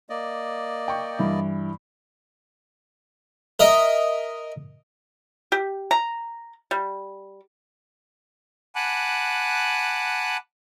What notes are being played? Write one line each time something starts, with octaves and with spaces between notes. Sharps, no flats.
A#3 D5 D#5
G5 C#6
G2 E3 E4
A#4 D#5 E5
G4
A#5
G3
F#5 G#5 A5 B5 D6 F#6